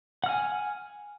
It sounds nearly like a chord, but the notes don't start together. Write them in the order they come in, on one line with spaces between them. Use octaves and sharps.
F#5 F6 G#5